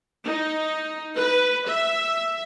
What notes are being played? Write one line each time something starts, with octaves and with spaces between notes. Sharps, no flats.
D#4
B4
E5